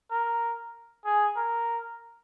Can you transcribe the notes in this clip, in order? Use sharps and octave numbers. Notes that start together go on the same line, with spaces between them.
A#4
G#4
A#4